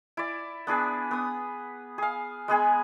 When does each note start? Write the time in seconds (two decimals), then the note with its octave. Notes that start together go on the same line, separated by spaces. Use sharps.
0.17 E4 D5
0.67 B3 D4 G#4 B4
1.11 B3 D#6
1.98 G#4 F5
2.48 G#3 B3 G#4 G#5